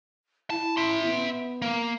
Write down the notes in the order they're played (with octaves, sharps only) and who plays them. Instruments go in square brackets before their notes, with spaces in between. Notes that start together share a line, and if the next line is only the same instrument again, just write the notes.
[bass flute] E4 [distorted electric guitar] A5
[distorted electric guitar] E5 C6
[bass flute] B3
[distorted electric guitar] A#3